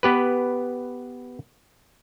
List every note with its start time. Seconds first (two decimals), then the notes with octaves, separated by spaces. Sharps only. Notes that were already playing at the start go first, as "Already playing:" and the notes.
0.03 B3 G4 B4